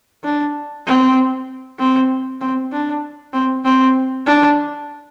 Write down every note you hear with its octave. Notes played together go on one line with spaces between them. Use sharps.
D4
C4
C4
C4
D4
C4
C4
D4